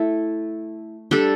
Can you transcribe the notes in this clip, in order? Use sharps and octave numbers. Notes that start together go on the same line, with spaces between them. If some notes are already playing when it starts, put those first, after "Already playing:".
Already playing: A3 E4 A4
G3 D4 A4